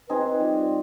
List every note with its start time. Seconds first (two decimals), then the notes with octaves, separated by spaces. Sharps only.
0.09 C4 D#4 G#4 B4
0.25 B4
0.40 G3 F4